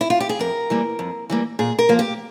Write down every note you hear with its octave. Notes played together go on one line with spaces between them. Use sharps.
E4
F4
G4
G#4
F2 A#4
E3 G3 A#3
F2
E3 G3 A#3
A#2 G#4
A#4
F3 A#3
G4